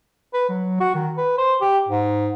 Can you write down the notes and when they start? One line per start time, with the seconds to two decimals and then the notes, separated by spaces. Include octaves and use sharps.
0.34 B4
0.49 F#3
0.80 F#4
0.95 D#3
1.17 B4
1.38 C5
1.61 G4
1.89 G#2